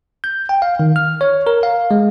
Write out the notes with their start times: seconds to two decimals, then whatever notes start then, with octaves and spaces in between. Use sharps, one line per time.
0.24 G6
0.49 G5
0.62 F5
0.80 D#3
0.96 F6
1.21 C#5
1.47 A#4
1.63 F5
1.91 G#3